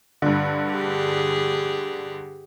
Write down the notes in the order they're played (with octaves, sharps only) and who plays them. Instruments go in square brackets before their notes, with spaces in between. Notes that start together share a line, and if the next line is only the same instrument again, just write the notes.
[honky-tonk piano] G2 D3
[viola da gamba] G4 G#4